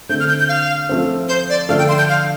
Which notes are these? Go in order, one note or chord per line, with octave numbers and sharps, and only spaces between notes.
D3 A3 C4 G6
F6
G6
G6
F5
F3 A3 C4
C5
D5
D3 F3 A3 D4 F5
G5
C6
G6
F5